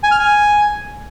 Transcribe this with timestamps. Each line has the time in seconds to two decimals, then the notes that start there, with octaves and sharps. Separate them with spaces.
0.03 G#5
0.11 F6
0.19 G#5